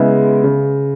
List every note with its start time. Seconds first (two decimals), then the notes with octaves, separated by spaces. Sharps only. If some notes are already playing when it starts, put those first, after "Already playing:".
Already playing: C#3 G#3 B3 E4
0.44 C#3